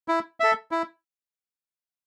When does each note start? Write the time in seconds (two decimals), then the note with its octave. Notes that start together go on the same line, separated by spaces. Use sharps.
0.08 E4
0.40 A4 E5
0.71 E4